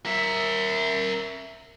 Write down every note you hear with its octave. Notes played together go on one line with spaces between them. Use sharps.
A#4 E5